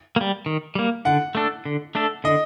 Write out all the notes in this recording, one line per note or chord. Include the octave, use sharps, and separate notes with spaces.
A#3
G3
D#3
G3 A#3
D3 F#5
A3 D4 A4
D3
A3 D4 A4
D3 D#5